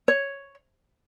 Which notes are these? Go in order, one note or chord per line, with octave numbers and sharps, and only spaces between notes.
C#5